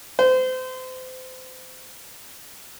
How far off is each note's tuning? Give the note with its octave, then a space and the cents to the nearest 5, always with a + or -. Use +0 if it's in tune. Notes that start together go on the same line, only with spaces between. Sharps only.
C5 -30